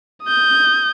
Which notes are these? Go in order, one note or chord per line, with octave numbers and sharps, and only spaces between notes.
D#6 G6